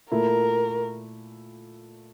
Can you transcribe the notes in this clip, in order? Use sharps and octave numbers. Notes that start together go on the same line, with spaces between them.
A#2 A3 E4 A#4